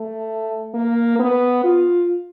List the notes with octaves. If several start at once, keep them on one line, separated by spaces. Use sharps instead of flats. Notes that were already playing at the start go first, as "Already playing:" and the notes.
Already playing: A3
A#3
B3
F4